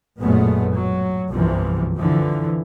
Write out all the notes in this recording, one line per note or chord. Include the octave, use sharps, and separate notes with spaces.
A1 F#2 A#2 G#3 A3 B3
F#3
G1 C2 F#2 C3 E3 F3
D3 E3 F3